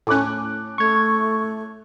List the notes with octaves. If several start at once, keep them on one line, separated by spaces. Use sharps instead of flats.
A2 C#4 A5 D6 F#6
A3 C#6 G#6